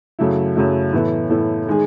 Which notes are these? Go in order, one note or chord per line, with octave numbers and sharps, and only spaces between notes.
F#2 C#3 F#3 A3 E4
F#2 C#3 F#3 A3 E4
A2 E3 B3 E4 A4
A2 E3 B3 E4 A4
D#3 G#3 D#4 G#4